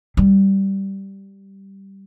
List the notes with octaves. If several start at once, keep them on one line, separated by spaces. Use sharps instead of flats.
G3